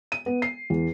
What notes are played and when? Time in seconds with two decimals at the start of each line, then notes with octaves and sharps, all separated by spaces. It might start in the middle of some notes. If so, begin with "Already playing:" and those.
0.12 D#7
0.26 B3
0.42 C7
0.70 E2